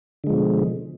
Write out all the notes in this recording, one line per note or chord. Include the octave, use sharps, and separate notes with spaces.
B2 D3 F3 G#3